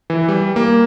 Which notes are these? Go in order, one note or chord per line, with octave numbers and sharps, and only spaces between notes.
E3
G3
A#3